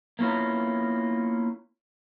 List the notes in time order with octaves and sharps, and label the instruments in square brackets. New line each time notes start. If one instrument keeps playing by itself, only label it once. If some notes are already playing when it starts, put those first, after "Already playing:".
[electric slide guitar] A#3 B3 C#4 E4 F4 A#4